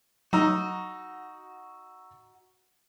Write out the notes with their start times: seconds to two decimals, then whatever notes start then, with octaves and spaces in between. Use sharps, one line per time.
0.33 F#3 D#4 F#4 A#5 E6